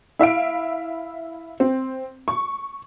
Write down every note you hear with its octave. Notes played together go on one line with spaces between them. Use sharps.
E4 E5 F5 D7
C4
C#6